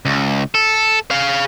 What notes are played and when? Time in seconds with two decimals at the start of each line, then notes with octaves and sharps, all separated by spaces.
0.05 C#2
0.55 A4
1.11 G#4 F5